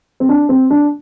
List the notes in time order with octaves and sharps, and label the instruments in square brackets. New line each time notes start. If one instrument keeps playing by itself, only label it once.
[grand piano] C4
D4
C4
D4